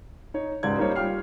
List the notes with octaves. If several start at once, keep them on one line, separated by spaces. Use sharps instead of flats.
D#4 C#5
C#2 G#2 G4 D5 G#6
G3 A#3 D#4 C5 C#5
G3 F4 G4 G5 F6 C7